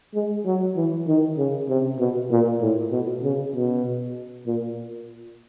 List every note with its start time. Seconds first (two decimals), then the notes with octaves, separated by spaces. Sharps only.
0.14 G#3
0.46 F#3
0.76 E3
1.07 D#3
1.37 C#3
1.69 C3
1.99 B2
2.31 A#2
2.61 A2
2.92 B2
3.23 C#3
3.54 B2
4.46 A#2